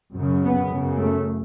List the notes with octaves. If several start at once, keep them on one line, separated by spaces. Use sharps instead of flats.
F#2 C#3
B3
F#2 C#3
A3